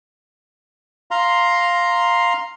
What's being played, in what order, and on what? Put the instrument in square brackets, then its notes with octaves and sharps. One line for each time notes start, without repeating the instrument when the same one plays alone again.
[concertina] F5 A#5 C6